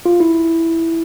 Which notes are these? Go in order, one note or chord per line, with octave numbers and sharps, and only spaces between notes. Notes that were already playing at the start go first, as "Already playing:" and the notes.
F4
E4